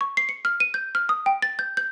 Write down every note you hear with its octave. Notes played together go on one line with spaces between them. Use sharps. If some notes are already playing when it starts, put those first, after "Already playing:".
C#6
C7
C#7
F6
D#7
G6
F6
D#6
G5
A6
G6
G6